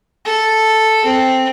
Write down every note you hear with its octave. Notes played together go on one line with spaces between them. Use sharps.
A4
C4